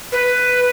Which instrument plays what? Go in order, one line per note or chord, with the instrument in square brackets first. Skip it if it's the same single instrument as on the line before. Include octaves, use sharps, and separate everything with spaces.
[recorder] B4